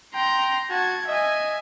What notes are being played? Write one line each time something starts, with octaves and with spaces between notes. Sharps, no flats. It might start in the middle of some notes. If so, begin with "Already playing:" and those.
G5 A#5 C6
F#4 A5 G#6
D#5 E5 G#5